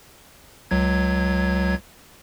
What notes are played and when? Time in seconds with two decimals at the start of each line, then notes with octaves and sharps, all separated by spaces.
0.71 C#2 F#3 G#6